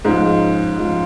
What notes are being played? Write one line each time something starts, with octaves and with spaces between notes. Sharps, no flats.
G#2 F3 G#3 C#4 F4
F3 G#3 C#4 F4